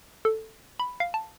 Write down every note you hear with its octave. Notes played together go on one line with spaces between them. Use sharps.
A4
B5
F5
A5